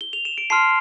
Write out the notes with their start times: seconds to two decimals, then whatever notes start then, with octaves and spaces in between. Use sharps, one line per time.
0.01 G7
0.13 F7
0.25 E7
0.38 D7
0.50 A5 C6 F6 C7